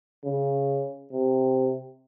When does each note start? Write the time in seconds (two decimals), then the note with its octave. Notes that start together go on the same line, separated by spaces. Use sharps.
0.24 C#3
1.12 C3